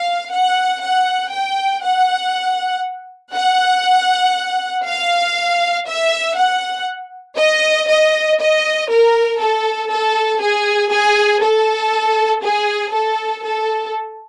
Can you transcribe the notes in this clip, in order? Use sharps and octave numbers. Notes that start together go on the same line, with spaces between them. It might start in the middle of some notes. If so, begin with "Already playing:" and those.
Already playing: F5
F#5
F#5
G5
F#5
F#5
F5
E5
F#5
D#5
D#5
D#5
A#4
A4
A4
G#4
G#4
A4
G#4
A4
A4